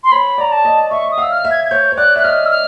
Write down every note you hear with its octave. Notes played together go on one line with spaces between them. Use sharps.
C6
C#5 B5
D5 A#5
A5
D#5
E5 C#6
D#6
F5 E6
F6
E5
G#6
G#6
C#5 G6
C#5
D5 F#6
E5 F#6
D#5 F6
E6
F6